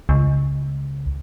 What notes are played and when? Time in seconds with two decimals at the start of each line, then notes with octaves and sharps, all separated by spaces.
0.09 C#2